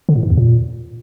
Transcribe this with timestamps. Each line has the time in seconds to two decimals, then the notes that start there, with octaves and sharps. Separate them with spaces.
0.09 D3
0.16 A2
0.23 G#2
0.30 E2
0.37 A#2